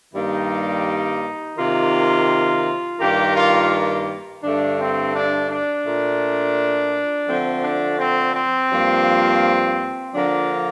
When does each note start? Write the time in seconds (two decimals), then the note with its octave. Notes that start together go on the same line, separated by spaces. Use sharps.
0.14 G2 D#3 G3 A#3 D#4
1.57 C3 D#3 A#3 F4
3.00 G2 D#3 A#3 G4
3.36 F4
4.43 G2 D3 A3 D4
4.79 C4
5.13 D4
5.49 D4
5.85 A#2 A3
7.28 D3 F3 A3 C4
7.64 D4
7.99 C4
8.35 C4
8.71 G2 F3 A#3
10.14 D3 F3 A#3 D4